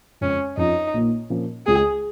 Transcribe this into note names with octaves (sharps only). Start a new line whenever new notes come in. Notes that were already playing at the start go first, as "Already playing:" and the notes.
F2 C#3 G#3 C#4
F2 F3 C#4 D#4 F4
A#1 A#2 A#3 D#4
A#2 F3 A#3 C#4
C#2 C#3 G#3 F4 G#4